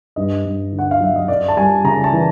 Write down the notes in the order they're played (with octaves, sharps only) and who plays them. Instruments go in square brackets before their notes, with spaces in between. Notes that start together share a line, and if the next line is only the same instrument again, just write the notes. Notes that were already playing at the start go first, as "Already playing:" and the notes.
[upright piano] G2 D#5
G2
D3
F#5
F5
F#3 E5
D#5
F#2 D5
A5
G3 G#5
C#3 A#5
A5
E3